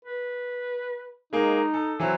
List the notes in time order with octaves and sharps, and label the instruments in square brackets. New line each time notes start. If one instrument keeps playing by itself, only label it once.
[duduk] B4
[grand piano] G#3 A#3 [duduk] D#4
[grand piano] A4
E3 F#3 C4